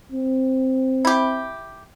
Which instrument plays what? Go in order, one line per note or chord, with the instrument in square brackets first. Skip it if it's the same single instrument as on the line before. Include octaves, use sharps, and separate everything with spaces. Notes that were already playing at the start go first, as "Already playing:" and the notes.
[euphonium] C4
[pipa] E4 G4